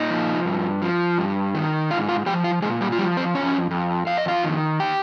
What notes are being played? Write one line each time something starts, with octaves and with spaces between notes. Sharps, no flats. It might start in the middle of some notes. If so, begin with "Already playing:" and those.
Already playing: A#2 D#4 D#5
F3
G2
F3
G2
D#3
G#2 F4 F5
F4 F5
F3 G4 G5
F4 F5
A#2 G#3 G#4
G3 G4
F4
F3 G3 G4
C4 C5
F2 C#4 C#5
F2
F2 F5
D#5
F4 F5
D#3
G4 G5